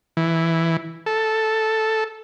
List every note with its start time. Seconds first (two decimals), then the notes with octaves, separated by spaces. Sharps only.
0.17 E3
1.06 A4